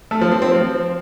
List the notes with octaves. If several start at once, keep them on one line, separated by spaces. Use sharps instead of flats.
A3
F3
C4
C4
F3